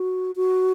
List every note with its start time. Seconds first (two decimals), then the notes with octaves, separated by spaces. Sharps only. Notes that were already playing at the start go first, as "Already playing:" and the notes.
Already playing: F#4
0.36 F#4